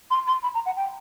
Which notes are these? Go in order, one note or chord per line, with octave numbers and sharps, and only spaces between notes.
C6
C6
B5
A#5
F#5
G5